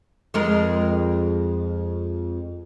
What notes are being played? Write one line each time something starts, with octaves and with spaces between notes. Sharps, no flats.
F2 G#3 A#4